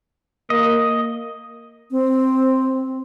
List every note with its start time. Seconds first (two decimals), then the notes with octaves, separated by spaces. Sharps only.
0.50 A#3 D#5
1.91 C4